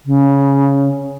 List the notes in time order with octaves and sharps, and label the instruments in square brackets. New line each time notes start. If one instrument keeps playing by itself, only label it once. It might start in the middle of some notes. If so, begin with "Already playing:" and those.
[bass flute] C#3